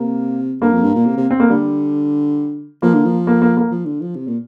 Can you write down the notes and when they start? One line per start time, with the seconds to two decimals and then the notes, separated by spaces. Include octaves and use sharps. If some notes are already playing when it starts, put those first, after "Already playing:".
Already playing: C3 A#3
0.61 G2 A#3
0.72 F2
0.83 G2
0.95 A#2
1.06 C3
1.17 C3
1.31 C4
1.40 A#3
1.50 D3 G3
2.82 F3 A#3
2.94 D3
3.05 F3
3.27 A#3
3.42 A#3
3.57 A#3
3.71 F3
3.86 D3
4.01 F3
4.16 C3
4.28 A#2